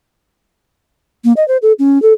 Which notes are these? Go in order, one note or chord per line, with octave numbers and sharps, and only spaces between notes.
A#3
D#5
C5
A4
C#4
A4